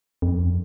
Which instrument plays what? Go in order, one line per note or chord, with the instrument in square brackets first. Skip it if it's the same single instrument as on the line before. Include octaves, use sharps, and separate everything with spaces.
[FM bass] F2